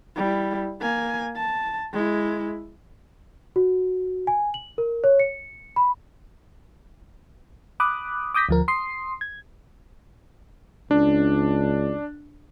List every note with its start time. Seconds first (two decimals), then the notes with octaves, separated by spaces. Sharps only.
0.16 G3 E4
0.81 A#3 G#5
1.37 A5
1.94 G#3 E4
3.56 F#4
4.27 G#5
4.54 F#7
4.78 A#4
5.04 C#5
5.20 C#7
5.76 B5
7.80 B5 D6 D#6 F#6
8.34 D6 D#6 G6 A#6 B6
8.49 D2 F3 A#4
8.68 C6 D#6 C7
9.21 G#6
10.91 C#2 D4